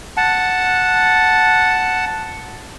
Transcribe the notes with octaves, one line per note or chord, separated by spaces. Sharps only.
F#5 A5